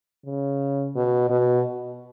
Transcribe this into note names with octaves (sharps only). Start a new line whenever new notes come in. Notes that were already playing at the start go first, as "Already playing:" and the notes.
C#3
B2
B2